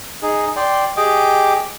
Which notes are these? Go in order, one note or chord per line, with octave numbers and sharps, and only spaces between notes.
D#4 G#4
D5 G5 C6
G4 G#4 D#5 G5 D6